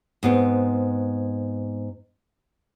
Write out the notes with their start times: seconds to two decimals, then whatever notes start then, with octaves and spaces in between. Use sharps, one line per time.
0.23 G#2 B3 C4